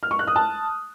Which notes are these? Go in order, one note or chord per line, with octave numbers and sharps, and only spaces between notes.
F6
C#6
F#6
D#6
A5